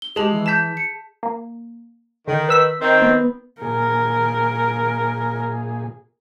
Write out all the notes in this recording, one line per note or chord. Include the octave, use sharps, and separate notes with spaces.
G7
G#3 G4 G#4 A5 F#7
E3
A5 G6 B6 E7
C#7
A#3
D3 D#3
B4 E6 B6
D#3 C4
B3
A#2 G#4 A#4